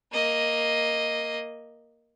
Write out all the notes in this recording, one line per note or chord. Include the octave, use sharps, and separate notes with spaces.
A#3 D#5